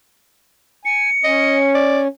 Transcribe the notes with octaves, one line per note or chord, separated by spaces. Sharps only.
G#5 C#7
C#4 D#5
D5